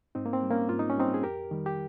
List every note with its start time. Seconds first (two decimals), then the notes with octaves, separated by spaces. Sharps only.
0.15 G#2 C4 D#4
0.26 A#3
0.33 C4
0.43 G3
0.51 A#3 C#4
0.69 G#2 F4
0.79 D#4
0.90 C#4
0.97 G3 C4 D#4
1.14 G#4
1.23 F2 G4 A#4
1.51 D#3 G3
1.66 G4